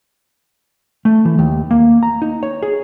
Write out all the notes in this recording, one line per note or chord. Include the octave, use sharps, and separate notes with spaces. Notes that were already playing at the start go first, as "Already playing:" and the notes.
A3
E3
D#2
A#3
A#5
D#4
C#5
G#4